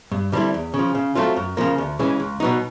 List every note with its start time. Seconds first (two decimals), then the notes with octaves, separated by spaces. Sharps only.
0.12 G2
0.32 D3 G3 C4 E4
0.54 E2
0.74 C#3
0.79 F3
0.95 C#3
1.15 F#3 A3 C4 F4
1.36 F#2
1.57 C#3 F3 A#3
1.78 D2
1.99 C#3 E3 G#3 C#4
2.20 C#2
2.40 B2 F#3 B3 D#4